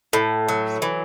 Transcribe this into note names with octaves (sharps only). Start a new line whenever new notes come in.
A2
F#3
E3